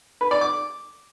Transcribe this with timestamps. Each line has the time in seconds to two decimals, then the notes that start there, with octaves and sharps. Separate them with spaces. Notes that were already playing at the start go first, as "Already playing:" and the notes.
0.21 B4
0.31 D5
0.41 D6